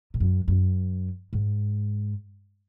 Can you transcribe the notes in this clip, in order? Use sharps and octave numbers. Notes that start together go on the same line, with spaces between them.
G#2
F#2
F#2
G#2